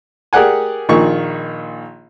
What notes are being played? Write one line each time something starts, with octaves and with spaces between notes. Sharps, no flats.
G4 G#4 A#4 D5 F#5 G#5
A#1 A#2 D#3 C#6